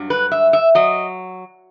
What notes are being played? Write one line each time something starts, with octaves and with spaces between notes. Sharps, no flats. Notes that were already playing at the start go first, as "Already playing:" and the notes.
Already playing: G2 F#3
B4
E5
E5
F#3 D#5